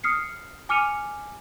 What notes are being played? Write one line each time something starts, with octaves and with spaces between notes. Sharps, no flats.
D#6 F6 C7 C#7
G#5 D6 F6 C#7 D#7 F7